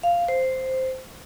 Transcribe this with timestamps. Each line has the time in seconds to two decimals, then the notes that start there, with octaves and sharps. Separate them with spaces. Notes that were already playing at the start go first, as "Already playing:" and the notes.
0.03 F5
0.28 C5